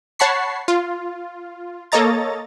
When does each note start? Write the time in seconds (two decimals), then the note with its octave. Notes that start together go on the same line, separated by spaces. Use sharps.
0.19 C#5 F#5 A5 B5 C#6 C7
0.68 F4
1.92 A#3 A4 C#5 D#5 A#5 A6